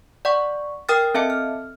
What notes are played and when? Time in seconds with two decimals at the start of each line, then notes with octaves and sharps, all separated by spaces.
0.25 D5 F#5 C#6
0.89 A#4 G5 D#6 F6 A6
1.14 C4 A4 D#5 E5 A5 C#7
1.30 F6